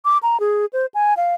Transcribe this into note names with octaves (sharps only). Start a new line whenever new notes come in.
D6
A#5
G#4
C5
G#5
F5